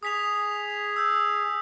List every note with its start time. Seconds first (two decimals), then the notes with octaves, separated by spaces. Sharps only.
0.03 G#4 D#6 B6 F7
0.96 E6 G6